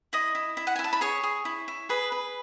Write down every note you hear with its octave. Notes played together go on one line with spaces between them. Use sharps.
E4 D#5 D#6
E4
E4
F#5
G#5
E4
A5
B5
G#4 C#5 C#6
G#4
E4
E4
G#4 B4 B5
B4